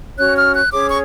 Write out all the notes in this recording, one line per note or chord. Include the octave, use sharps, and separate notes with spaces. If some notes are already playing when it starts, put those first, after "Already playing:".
C#4 F#4 C#5 F#6
F6
F#6
C#4 G#4 C#5 D6
C#6